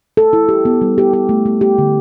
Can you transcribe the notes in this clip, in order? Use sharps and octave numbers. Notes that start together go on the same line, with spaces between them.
A4
E4
G4
B3
G3
G4
G4
A3
A3
G4
D3